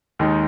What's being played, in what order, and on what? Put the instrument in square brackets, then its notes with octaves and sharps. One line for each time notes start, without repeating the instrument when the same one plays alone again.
[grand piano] D#2 D#3 G#3 D#4